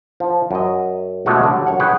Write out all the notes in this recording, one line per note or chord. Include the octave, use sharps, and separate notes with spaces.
F3
F#2 D#5
B2 G#3 A3 C#4 D4 F#4
D3 F#3 G3
F#2 C#5 F#5
G#4 B4 C#5 F#5 G5